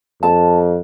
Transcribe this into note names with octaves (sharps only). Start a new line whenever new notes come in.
F2 A5